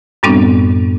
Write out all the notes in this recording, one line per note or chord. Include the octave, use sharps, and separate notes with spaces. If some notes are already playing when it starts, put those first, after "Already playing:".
F#2 A2 G3 B3 C4 D4